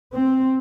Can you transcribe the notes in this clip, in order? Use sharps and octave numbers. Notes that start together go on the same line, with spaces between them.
C4